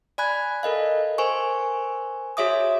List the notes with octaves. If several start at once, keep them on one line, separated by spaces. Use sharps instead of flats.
D5 G#5 B5 F#6 G#6
A4 A#4 D#5 F5
A#4 C5 G#5 C#6
F#4 G#4 C#5 E5 D6 D#6